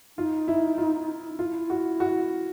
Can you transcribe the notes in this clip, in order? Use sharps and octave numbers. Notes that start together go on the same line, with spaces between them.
D#4 F4
E4
F4
E4 F4
F#4
F#4